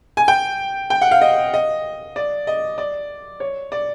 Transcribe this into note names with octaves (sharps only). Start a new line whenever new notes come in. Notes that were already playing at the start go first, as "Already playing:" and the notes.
G#5
G5
G5
F#5
F5
D#5
D#5
D5
D#5
D5
C#5
D5